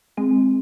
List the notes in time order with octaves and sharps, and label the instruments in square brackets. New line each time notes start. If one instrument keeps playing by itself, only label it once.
[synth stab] G#3 [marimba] C4